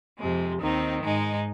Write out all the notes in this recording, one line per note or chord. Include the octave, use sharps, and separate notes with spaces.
F2 C3 G#3
D#2 D#3 C4 D#4
G#2 G#3 D#4